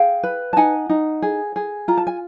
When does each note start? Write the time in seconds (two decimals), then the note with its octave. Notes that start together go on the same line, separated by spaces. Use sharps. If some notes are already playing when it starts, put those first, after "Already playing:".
Already playing: G#4 F5 G5
0.23 B4
0.53 A5
0.57 D#4 F#5 G#5
0.89 D#4
1.22 G#4
1.56 G#4
1.88 F4 A#5
1.97 A5
2.07 G#5